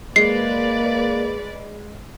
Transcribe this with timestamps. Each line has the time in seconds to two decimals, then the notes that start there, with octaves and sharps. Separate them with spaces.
0.16 G#3 A#3 B4 D5 C7